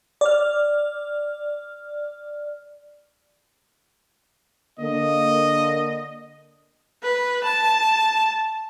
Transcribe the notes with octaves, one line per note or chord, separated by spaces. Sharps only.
D5 F6
D3 A#3 D#5
B4
A5